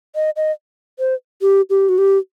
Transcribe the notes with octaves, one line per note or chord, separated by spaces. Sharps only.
D#5
D#5
C5
G4
G4
F#4
G4